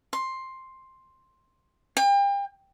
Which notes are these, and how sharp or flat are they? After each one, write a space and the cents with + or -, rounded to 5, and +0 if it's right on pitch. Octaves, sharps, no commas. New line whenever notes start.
C6 +10
G5 +35